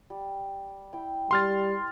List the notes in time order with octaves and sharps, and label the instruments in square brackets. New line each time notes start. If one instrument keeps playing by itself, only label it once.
[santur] G3
E4 G5
[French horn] G3 [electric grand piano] C6 F6 A6